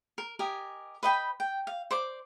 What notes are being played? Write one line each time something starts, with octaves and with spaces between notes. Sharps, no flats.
A#4
G4 A#4 D#5 G#5
B4 D#5 G5 B5
G5
F5
C5 D5 D6